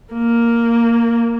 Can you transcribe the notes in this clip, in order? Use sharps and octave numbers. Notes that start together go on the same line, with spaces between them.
A#3